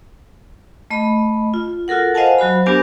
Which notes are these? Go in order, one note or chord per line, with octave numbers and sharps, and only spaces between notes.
A3 D#5 B5
F4
F4 F#4 A4 A#4 F#5
C5 D#5 F5 F#5 G#5 A5
F#3 F#4 C5 B5
B3 D4 G4 A#4 C5 G#5